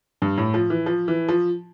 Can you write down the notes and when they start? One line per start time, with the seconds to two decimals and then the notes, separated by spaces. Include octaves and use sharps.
0.22 G2
0.38 A2
0.54 F3
0.70 E3
0.86 F3
1.08 E3
1.28 F3